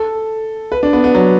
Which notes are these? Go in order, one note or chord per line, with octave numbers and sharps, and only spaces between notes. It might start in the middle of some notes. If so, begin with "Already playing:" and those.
Already playing: A4
B4
D4
B3
B3
F#3